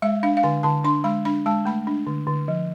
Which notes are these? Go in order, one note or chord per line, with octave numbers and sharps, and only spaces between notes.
G#3 E5
D4 F5
F5
D3 G#5
D3 A5
D4 C6
G#3 B5
D4 B5
G#3 A5
A3 B5
D4
D3
D3
F3